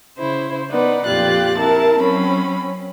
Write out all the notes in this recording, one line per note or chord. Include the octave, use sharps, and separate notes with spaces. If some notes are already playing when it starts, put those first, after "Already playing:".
C#3 E4 C5
B3 D#4 B4 D5 F#5
F2 A#2 F4 G4 F#6 A6
C4 E4 A#4 A5
F#3 C4 C#4 B5